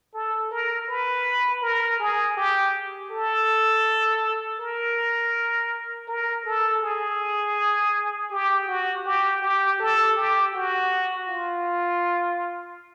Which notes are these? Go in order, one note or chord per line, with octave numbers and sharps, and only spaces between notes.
A4
A#4
B4
A#4
G#4
G4
A4
A#4
A#4
A4
G#4
G4
F#4
G4
G4
A4
G4
F#4
F4